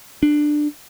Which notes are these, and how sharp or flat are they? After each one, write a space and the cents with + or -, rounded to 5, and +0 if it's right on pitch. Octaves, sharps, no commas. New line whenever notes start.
D4 +15